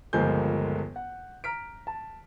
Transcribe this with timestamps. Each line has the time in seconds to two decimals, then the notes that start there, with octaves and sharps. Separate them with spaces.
0.13 G1 C#2 F3 A#3 G#5 G6
0.96 F#5
1.44 A#5 F6 B6 D7
1.87 A5